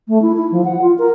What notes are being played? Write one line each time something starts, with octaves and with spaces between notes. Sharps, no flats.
A3
E4
E4
F3
F#5
F4
A#4